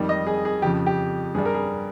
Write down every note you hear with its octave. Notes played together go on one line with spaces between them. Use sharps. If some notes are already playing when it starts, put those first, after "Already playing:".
Already playing: F2 D#3 G3
D#5
G#4
G#4
F2 C#3 F3 G4
G4
G2 G3 G#4
A#4
G#4